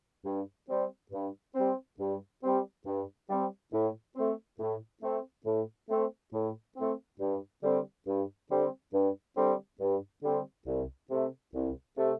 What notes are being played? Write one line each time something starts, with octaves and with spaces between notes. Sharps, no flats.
G2
G3 C4
G2
G3 C4
G2
G3 C4
G2
G3 C4
A2
A3 C4
A2
A3 C4
A2
A3 C4
A2
A3 C4
G2
D3 G3 C4
G2
D3 G3 C4
G2
D3 G3 C4
G2
D3 G3 C4
C2
C3 A3
C2
C3 A3